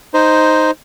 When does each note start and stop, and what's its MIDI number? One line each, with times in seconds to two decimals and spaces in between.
0.14 0.71 63
0.14 0.71 72